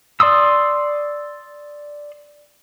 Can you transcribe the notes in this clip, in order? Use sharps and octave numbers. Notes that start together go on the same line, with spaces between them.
D5 C6 D#6 E6